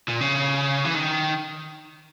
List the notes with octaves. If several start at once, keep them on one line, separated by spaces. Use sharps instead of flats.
A#2
C#3
E3
D#3